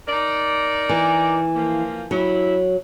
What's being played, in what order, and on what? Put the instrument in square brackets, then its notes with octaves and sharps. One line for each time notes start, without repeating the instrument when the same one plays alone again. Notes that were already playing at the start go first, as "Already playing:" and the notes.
[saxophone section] D#4 A#4 D5
[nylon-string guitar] E3
[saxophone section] F3 A#3
[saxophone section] G2 E4 [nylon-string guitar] F#3